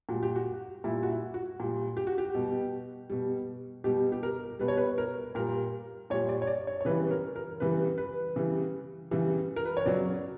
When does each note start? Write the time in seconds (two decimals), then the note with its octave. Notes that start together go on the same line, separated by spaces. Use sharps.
0.09 A#2 G3 F#4
0.23 G4
0.36 F#4
0.84 A#2 G3 E4
1.03 F#4
1.09 E4
1.34 F#4
1.60 A#2 G3
1.97 G4
2.07 F#4
2.18 G4
2.35 B2 G3
3.10 B2 G3
3.84 B2 G3 G4
4.12 G4
4.23 A#4
4.59 B2 G3 B4
4.68 C#5
4.77 B4
4.98 A#4
5.35 A#2 G3 A#4
6.10 A#2 G3 C#5
6.29 D5
6.42 C#5
6.47 D5
6.67 C#5
6.81 C#5
6.85 C#3 E3 G3 B4
7.11 A#4
7.36 A#4
7.60 C#3 E3 G3 B4
7.98 B4
8.36 C#3 E3 G3
9.11 C#3 E3 G3
9.56 A#4
9.65 B4
9.77 C#5
9.86 C#3 F#3 D5